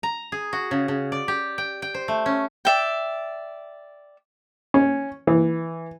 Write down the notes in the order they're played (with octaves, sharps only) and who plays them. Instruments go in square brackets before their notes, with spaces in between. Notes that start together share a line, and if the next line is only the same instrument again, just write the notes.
[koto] A#5
G#4
F#4
C#3
C#3
D5
G4
G5
G5
C5
A3
C#4
[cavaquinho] D5 E5 G5
[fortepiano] C#4
E3